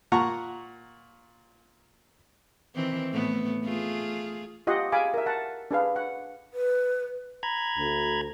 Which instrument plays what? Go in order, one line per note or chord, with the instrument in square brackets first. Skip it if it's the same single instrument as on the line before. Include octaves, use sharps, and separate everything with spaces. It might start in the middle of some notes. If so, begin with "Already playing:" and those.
[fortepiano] A#2 F#5 A#5 C#6
[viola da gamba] D#3 E3 C4
A2 A3 B3
A3 F4 G#4
[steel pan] F4 G4 D#5 F#5
G#4 F5 G#5 B5 D6
A#4 E5
F#5 A5
D4 G#4 B4 F5
F#5
[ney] B4
[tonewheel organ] A#5 B5 G#6
[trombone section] D2